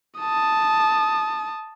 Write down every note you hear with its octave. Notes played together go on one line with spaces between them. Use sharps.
A5 D#6